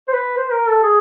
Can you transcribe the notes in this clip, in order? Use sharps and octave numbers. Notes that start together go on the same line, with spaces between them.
C5
B4
C5
A#4
A4
G#4